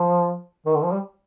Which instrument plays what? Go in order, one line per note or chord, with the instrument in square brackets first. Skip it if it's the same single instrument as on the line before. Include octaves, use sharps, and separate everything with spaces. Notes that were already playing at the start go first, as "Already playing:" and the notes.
Already playing: [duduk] F3
D#3
D3
F3
G3